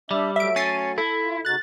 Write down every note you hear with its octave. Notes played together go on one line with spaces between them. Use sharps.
G3 D4 D5 E5
F#3 A3 E5 D7
C#4 A6 C7 D#7
E4 A4
F4
C#3 D#4 F#4 F#6 A6